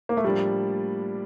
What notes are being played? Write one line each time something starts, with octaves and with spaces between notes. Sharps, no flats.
A#3
A3
A2 F3 G3 A#3 D4